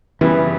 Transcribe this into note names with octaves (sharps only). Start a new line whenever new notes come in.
F#2 C#3 E3 G3 B3 E4